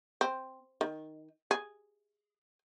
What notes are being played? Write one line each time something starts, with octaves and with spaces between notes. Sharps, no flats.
C4
D#3
G#4